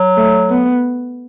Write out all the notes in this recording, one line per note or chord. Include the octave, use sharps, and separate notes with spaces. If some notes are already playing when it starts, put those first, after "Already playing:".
Already playing: F#3
A3
B3